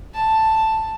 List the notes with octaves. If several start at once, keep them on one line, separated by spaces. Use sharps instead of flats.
A5